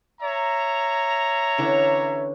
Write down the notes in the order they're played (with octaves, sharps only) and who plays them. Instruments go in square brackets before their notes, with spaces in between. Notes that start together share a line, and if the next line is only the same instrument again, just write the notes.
[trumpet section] C#5 E5 A#5
[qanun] D3 E3 C#4